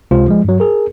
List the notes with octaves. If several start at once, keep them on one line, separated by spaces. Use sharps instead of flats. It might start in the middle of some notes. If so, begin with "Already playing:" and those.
C#2 C3 G#3 F4 C5
F3 G#3
G2 F#3
G#4 A#4